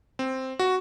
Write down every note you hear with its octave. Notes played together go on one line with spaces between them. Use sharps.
C4
F#4